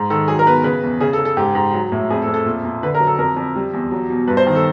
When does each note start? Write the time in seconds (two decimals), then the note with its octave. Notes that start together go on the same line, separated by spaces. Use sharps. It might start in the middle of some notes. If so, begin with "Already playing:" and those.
Already playing: G#2
0.10 D#3 A4
0.28 F#3 G#4
0.39 A#4
0.47 B2 B4
0.64 C#3 B4
0.83 E2
1.00 C#3 G#4
1.13 A4
1.18 C#3
1.25 A4
1.37 G#2 G4
1.55 G#2
1.74 F#3
1.92 A2
2.10 F2 G#4
2.22 A4
2.27 F2
2.34 A4
2.46 A#2
2.65 A#2
2.83 D3 B4
2.95 A#4
3.00 F#3
3.07 A4
3.18 F2 A#4
3.36 F2
3.56 G3
3.74 E2
3.92 F#3
4.10 B2
4.28 G2 B4
4.37 C5
4.47 D#3
4.55 A4